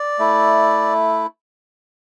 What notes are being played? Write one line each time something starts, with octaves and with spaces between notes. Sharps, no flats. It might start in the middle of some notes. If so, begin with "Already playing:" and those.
Already playing: D5
A3 E4